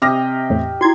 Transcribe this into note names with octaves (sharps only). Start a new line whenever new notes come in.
C3 G4 D#5 F6 A#6
E2 A2
E4 F#4 C6 G#6